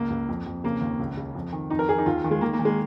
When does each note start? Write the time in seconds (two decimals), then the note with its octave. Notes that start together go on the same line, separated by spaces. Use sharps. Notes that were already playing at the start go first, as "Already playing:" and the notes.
Already playing: C#2 A#3
0.10 C#2
0.28 F2
0.46 F2
0.64 C#3 A#3
0.82 D#2
0.99 C#2
1.17 C#3
1.35 F2
1.53 D#3
1.70 F2 D#4
1.79 A#4
1.88 F2 G#4
1.98 D#4
2.06 D#2 F4
2.24 D#3
2.31 G#3
2.41 D#3 A#3
2.53 A#3
2.59 D#3
2.65 G#3